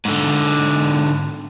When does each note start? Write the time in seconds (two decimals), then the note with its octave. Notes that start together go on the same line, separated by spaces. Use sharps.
0.05 G#2 D3